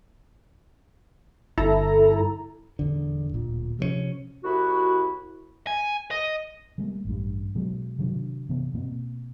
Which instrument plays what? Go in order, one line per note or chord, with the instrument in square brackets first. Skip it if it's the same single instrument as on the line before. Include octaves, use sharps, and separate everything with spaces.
[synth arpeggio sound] G1 E4 A4 A#5
[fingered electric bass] D#1 E2 D3
D1 A#2
C3 F3 A3 C#4
[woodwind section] C2 E4 F#4
[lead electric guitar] G#5
D#5
[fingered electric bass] G3 G#3 A#3 B3
A1 G2
B2 F#3 G#3
C3 D#3 F#3 D4
C3 E3 B3
B2 A#3 C4